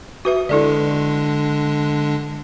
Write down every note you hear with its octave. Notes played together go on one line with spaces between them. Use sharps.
F#4 B4 E5 D#6
D3 G#3 D4 E4 A4 D5